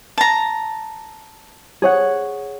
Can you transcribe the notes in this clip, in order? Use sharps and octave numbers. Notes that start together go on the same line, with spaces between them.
A5 A#5
G#4 C#5 F#5